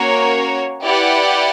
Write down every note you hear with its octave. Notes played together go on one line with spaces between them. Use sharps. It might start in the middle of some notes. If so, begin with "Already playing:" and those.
Already playing: A#3 C#4 F#4 A#4 C#5
E4 G4 B4 D5 F#5